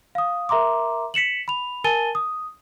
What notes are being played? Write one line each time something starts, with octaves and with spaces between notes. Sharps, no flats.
F5 D#6
A#4 E5 A#5 C6 D6
B6 C#7 E7 F#7
B5 F7
A#4 G#5 A5 A6 D#7 G7
D#6